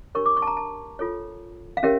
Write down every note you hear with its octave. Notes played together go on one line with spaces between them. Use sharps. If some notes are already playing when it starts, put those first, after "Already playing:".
D4 G4 A#4 C#5 C#6
D6
C#6
A5
A#5
A5
F4 A4 C#5
F5
C#4 G4 A#4 C#5 E5